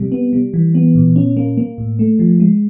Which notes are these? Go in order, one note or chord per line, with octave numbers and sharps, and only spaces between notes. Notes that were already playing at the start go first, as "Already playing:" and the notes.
Already playing: C3 G3
B3
G3
E3
B3
A#2
C#4
A#3
A#3
A2
A3
F3
G#3